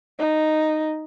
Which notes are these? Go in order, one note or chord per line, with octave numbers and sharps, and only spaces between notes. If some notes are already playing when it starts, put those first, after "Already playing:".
D#4